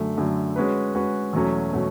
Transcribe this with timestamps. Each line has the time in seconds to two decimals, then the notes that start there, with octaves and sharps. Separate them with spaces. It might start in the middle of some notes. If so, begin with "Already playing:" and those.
Already playing: F#2 D3 A3
0.17 F#2 D3 A3
0.56 G#3 C#4 F#4 B4
0.94 G#3 C#4 F#4 B4
1.33 E2 B2 F#3 A3 C#4
1.73 B2 F#3 A3 C#4